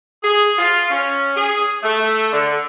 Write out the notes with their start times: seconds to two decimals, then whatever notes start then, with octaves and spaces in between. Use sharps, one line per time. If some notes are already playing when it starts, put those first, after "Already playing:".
0.23 G#4
0.59 F4
0.90 C#4
1.36 G#4
1.83 A3
2.32 D3